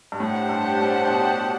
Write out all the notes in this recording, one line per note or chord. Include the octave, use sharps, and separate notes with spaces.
G2
A2 D4 G4 C5 F#5 A5
G2
A2
B2